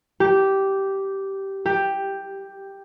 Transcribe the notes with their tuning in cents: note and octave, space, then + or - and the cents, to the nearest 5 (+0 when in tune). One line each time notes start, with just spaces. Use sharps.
G4 -10
G4 +5